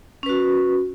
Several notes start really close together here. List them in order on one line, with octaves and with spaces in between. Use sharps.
C#4 B4 F#4